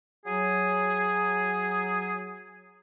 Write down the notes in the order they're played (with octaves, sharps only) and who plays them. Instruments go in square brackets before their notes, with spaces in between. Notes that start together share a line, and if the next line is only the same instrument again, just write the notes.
[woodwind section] F#3 G#4